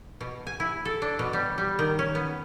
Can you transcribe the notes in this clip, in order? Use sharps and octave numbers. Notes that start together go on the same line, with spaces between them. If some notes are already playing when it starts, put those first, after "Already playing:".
B2
G#5
E4
A4
D4
B2
G3
G3
D#3
C#4
B3